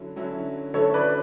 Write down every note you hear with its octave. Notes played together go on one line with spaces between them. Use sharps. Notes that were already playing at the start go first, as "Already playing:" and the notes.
Already playing: D3 F#3 C#4 E4
D3 F#3 C#4 E4
D3 F#3 A3 C#4 E4 A4 C#5
B4 D5